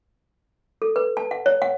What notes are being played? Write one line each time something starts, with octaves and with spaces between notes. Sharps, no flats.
A4
B4
A5
F#5
C#5
F#5